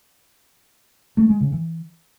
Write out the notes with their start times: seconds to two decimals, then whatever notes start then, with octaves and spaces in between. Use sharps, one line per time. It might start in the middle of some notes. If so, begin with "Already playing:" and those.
1.17 A3
1.29 G#3
1.40 C#3
1.52 E3